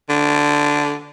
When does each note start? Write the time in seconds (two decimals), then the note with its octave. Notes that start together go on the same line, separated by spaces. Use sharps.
0.09 D3